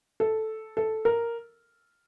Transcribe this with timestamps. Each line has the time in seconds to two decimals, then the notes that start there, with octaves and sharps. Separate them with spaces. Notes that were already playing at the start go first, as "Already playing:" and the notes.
0.20 A4
0.77 A4
1.05 A#4